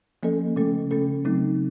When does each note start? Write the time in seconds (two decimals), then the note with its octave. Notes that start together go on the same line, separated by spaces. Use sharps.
0.23 F3 A#3 C#4 A4 D#5
0.56 C#3 A3 C#4 A4
0.91 C#3 A3 C#4 A4
1.25 C#3 F#3 A3 C4 D#4